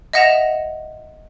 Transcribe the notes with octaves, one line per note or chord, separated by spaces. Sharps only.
D#5 E5 F#5 A#6 E7 F7